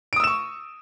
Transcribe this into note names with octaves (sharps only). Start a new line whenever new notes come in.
C#6 D#6 E6 D7 E7